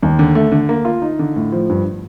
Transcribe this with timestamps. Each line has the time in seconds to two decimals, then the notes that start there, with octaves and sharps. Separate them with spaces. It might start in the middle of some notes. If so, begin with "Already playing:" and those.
0.02 D#2
0.19 D3
0.35 A3
0.52 D3
0.69 A#3
0.85 F4
1.02 D#4
1.19 D3
1.36 A2
1.52 F3
1.70 G2